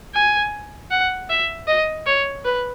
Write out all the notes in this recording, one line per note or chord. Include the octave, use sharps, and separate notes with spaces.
G#5
F#5
E5
D#5
C#5
B4